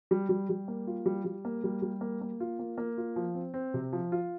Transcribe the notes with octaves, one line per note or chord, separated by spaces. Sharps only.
G3
G3
G3
A#3
F4
G3
G3
A#3
G3
G3
A#3
A#3
F4
A#3
A#3
F4
F3
C4
C4
C3
F3
F4